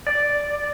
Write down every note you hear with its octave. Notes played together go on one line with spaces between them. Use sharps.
D5